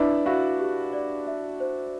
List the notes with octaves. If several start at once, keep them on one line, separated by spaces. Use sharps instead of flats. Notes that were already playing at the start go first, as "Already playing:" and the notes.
Already playing: D4 E4 B4
E4 F#4 F5
G4
D5
E5
C5